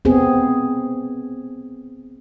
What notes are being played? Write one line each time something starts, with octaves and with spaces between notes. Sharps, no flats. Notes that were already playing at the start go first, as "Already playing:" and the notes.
B3 C4 G#4